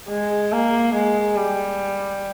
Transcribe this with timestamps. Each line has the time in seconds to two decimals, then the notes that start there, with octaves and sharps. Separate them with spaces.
0.08 G#3
0.51 A#3
0.94 G#3
1.36 G3